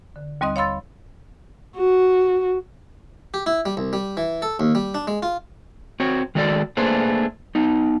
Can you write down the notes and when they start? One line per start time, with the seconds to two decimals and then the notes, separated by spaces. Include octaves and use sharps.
0.16 D3
0.41 D#2 G3 C4 D#5 D#6
0.56 C#5 F5 B5 C6 E6 A6
1.76 F#4
3.34 G4
3.46 E4
3.66 G3
3.77 C2
3.93 G3
4.17 E3
4.42 A4
4.60 D#2
4.75 G3
4.95 D4
5.07 G#3
5.23 F4
6.00 C4 F#4 C#5
6.35 D#3 G#3 F#4 A4 C#5 D5
6.77 A3 A#3 D4 G#4 B4 C5
7.55 B3 D#4